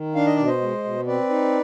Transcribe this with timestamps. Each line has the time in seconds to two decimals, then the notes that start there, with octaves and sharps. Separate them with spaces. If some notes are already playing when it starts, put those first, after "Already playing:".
Already playing: D#3
0.15 D4 F5
0.26 D#5
0.36 B2 D5
0.47 C5 D#5
0.61 G#3
0.84 B2
1.06 C4 B4 D5
1.29 D#4